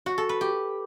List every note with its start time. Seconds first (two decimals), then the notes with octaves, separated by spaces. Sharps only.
0.06 F#4
0.18 A4
0.29 B4
0.41 G4